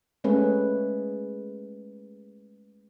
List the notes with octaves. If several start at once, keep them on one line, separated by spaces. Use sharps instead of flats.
G#3 A3 C#4 G#4 B4